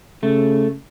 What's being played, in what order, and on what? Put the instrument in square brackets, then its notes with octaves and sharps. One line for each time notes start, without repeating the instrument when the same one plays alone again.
[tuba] C#3 [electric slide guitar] A3